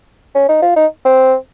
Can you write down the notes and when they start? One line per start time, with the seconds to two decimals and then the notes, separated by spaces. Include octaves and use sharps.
0.35 C#4
0.49 D#4
0.62 F4
0.76 D#4
1.05 C4